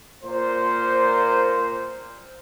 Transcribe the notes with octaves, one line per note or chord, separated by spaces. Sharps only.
A#2 C5